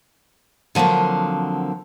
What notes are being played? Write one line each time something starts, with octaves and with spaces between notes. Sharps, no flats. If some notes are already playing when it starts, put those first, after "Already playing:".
D3 F3 F#3 A#3 C4